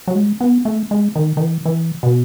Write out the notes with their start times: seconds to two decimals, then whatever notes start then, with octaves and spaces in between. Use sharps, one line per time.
0.07 F#3
0.15 G#3
0.41 B3
0.65 A3
0.91 G#3
1.16 D#3
1.37 D#3
1.40 E3
1.65 E3
2.03 B2